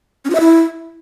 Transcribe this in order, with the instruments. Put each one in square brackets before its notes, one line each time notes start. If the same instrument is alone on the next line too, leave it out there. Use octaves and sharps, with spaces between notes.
[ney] C#4
F4
E5
E4